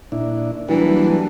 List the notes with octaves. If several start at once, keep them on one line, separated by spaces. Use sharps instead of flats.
A#2 D4 E4
E3 F#3 G3 A#3 D4